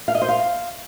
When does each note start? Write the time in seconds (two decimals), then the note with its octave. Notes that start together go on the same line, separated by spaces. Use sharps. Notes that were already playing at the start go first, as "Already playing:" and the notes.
0.08 F5
0.15 D#5
0.22 C5
0.28 F5